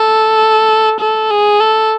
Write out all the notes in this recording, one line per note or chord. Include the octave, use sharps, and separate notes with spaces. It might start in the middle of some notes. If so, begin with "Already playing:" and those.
Already playing: A4
A4
G#4
A4